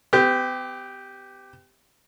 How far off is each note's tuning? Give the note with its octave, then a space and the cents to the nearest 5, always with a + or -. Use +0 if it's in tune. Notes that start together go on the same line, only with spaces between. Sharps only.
B3 +45 G4 +0